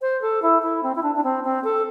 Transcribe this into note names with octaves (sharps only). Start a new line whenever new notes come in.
C5
A4
E4
E4
C4
E4
D4
D4
C4
C4
A4